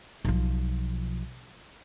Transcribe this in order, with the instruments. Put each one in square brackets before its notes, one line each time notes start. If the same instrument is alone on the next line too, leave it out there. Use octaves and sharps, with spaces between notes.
[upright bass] B1 F3